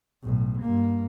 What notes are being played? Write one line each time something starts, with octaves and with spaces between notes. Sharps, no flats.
B1 A2
G2 A#3